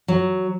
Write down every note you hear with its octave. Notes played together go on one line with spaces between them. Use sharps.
F#3